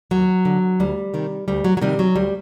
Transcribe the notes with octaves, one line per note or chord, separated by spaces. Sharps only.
D#2 F#3
D3
D2 G3
C3 D#3
D2 G3
F#3
F#3
C3 D#3 G3
F#3
D2 G3